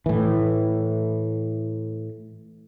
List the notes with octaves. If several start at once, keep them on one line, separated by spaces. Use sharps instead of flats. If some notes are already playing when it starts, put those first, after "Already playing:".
A2 E3